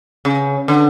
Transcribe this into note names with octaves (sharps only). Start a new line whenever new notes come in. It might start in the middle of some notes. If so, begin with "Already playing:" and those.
C#3
D3